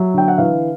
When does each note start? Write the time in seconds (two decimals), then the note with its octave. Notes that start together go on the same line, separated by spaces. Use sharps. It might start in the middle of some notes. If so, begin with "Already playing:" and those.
Already playing: F#3 E5
0.14 D3 G5
0.28 F#5
0.38 E3 F5